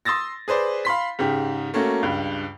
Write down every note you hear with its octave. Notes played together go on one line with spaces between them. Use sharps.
C6 D#6 E6 A6 A#6
G#4 B4 C5 D5
F5 B5 C6 B6
G#2 C#3 G4
A3 A#3 C#4 F#4
C#2 G2